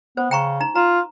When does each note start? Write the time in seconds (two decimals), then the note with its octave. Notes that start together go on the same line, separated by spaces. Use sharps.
0.17 B3 C5
0.31 C#3 G5 A#5 C#6
0.60 D#4 A#5
0.75 F4 A#5